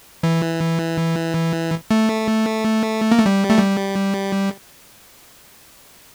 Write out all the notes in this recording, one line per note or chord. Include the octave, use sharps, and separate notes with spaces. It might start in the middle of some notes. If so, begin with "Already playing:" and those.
E3
A3
A#3
A3
G3
A3
G3